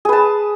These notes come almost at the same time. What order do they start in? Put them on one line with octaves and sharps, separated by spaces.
G#4 B4 A5